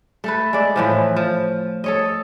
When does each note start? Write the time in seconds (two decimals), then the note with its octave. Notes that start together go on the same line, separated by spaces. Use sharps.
0.24 A3 A4 B4
0.53 G#3 D5 E5
0.76 A2 E3 F3
1.16 F3
1.84 A4 C#5 D#5